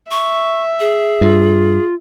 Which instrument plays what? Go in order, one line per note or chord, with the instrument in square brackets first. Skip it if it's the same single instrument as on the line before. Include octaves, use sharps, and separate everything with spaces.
[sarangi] E5 [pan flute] C#6
[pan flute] G#4
[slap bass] G2 [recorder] F4